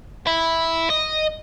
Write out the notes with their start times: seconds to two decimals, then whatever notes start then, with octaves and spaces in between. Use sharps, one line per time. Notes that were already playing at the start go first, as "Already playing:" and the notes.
0.27 E4
0.90 D#5